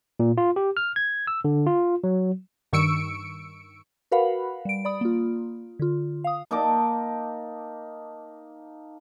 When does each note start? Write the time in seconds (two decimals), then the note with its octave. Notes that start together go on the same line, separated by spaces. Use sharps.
0.20 A#2
0.38 F4
0.56 G4
0.77 F6
0.96 G#6
1.27 E6
1.45 D3
1.67 F4
2.04 F#3
2.73 G2 D#3 C#6 E6 C#7 D7
4.12 F#4 A#4 B4 F5 F#5 B5
4.65 G3 D7
4.85 D5 B5 D#6
5.01 A#3 F4
5.79 D3 F4
6.24 F5 D#6
6.51 A#3 D#4 A5 D6